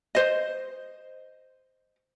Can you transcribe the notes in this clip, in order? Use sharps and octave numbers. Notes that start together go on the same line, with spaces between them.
C5 D#5